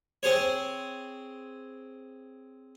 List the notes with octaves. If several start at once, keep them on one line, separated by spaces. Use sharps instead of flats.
C4 G#4 C5 C#5